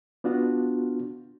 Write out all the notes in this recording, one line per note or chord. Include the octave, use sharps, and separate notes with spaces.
B3 D4 F4 F#4